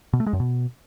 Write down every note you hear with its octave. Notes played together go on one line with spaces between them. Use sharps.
B2
A3
G#3
F#2
B2